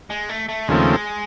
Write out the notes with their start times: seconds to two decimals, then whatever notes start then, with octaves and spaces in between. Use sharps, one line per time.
0.10 G#3
0.29 A3
0.49 A3
0.68 D#2 C#3 F3 G#3 A3 C4